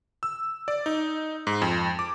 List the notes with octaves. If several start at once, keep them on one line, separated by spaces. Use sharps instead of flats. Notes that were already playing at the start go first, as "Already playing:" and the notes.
E6
D5
D#4
G#2
F2
D6